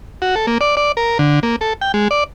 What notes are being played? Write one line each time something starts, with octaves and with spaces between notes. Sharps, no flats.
F#4
A4
A#3
D5
D5
A#4
D3
A#3
A4
G5
G#3
D5